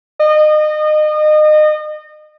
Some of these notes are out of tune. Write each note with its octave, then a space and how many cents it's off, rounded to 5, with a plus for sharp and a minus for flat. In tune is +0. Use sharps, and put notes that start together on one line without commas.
D#5 -30